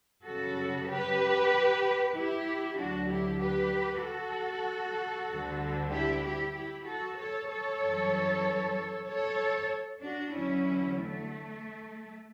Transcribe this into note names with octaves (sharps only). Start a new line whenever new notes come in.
F#2 C#3 G3 F#4 A4
G4 B4
E4 G4
D2 D3 F#3 D4 F#4
E4 G4
G4 B4
F#4 A4
D2 D3 G3
E4 G4
E4 G4
E4 G4
F#4 A4
A4 C#5
A4 C#5
F#2 E3 G3
A4 C#5
D4 F#4
E2 D3 F#3 C#4 E4
A3